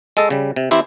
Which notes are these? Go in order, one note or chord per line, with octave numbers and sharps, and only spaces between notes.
G#3 A4 D#5
C#3 G3
C3
E3 C4 E4 G4 C5